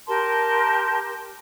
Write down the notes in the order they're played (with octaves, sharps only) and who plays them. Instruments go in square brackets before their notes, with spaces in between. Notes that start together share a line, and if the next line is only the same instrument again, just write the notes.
[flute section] G4 A#4 A5 C6